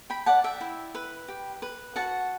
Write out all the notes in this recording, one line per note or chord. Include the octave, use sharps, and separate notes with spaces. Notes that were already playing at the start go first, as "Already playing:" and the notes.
G5 B5
D5 F#5 A5
E5 G5
E4
B4
G4
B4
F#4 F#5 A5